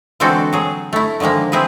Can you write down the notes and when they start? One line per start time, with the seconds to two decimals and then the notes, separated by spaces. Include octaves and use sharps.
0.20 D3 E3 G#3 C4 F#4 A4
0.53 F#3 G#4
0.93 A3 E4
1.20 D3 D#3 F3 G#3 A#3
1.52 C4 E4 G#4 B4